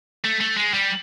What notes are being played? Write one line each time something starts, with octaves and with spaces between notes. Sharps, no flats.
A3
A3
G#3
G3